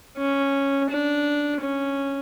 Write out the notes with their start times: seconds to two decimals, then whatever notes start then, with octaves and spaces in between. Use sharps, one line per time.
0.18 C#4
0.89 D4
1.61 C#4